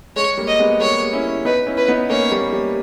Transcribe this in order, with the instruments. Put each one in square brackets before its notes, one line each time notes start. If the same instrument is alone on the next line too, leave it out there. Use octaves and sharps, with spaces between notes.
[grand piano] G#3 [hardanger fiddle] C#5
[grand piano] G3 A#3
[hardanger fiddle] D#5
[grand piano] G#3 B3
[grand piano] G3 A#3 [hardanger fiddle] C#5
[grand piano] C#4 E4
[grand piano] B3 D#4 [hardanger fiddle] B4
[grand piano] C#4 E4
[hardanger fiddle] B4
[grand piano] B3 D#4
[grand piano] A#3 C#4 [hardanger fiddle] C#5
[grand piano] G3 A#3
G3